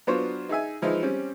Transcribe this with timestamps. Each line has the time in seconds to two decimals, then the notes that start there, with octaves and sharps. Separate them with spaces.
0.07 F#3 B3 D4 F4 C5 C#5
0.49 D#4 G#4 E5 G#5
0.82 E3 F3 G#3 D#4 E4
1.03 G3 C4 C#4